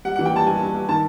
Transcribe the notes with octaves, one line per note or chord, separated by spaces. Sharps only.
G3 F#5
F#5
E3
G5
G3 A5
G2 G#5
G2
G2
D#3 A5